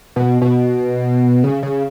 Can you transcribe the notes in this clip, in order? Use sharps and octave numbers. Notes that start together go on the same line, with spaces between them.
B2
B2
C#3
C#3